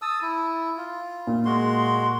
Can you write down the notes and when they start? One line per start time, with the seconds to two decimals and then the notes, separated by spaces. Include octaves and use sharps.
0.02 A5 D#6 E6
0.22 E4
0.77 F4
1.27 A#2
1.45 G#3 F#4 C6